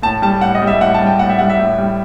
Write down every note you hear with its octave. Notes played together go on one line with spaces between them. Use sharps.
A2 A5
G3 A5
A2 F#5
D#5
G3
E5
A2 F#5
A5
G3
G5
A2 F#5
E5
G3 F#5
E5
A2
G3